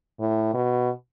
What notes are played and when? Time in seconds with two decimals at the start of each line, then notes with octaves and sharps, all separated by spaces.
0.20 A2
0.54 B2